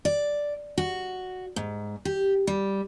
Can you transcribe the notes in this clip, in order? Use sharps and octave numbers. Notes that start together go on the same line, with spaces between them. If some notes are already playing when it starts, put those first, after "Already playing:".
D5
F#4
G#2
G4
G3